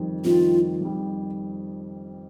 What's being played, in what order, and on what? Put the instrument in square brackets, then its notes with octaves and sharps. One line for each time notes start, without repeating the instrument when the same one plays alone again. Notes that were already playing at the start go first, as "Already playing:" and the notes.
Already playing: [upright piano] F2 D#3 G3
[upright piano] F2 D#3 G3 [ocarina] F4
[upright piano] F2 D#3 G3